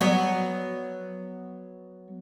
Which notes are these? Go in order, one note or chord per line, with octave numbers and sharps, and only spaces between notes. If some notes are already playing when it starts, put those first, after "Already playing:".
F#3 B3 C#5